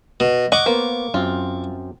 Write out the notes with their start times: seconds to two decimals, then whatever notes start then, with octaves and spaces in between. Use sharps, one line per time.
0.20 B2
0.52 D#5 F#5 C#6 D6
0.66 A#3 B3 C5
1.14 F#2 C4 F4